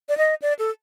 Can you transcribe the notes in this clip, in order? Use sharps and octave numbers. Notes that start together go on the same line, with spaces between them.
D5
D#5
D5
A4